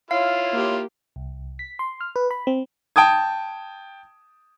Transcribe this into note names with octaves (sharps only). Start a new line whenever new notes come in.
E4 F4 C#5 F5
A#3 G4
C2
B6
C6
F6
B4
B5
C4
G5 A5 D#6 G#6